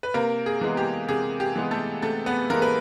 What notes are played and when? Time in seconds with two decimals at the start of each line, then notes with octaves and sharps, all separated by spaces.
0.03 B4
0.14 C3 A#3 A#4
0.46 G#4
0.61 E3 G#3 B3
0.77 G4
1.09 C3 G#4
1.40 G4
1.56 E3 G#3 B3
1.71 A3 A4
2.02 C3 A3 A4
2.26 B3 B4
2.50 E3 G#3 A#3 B3 A#4
2.62 B4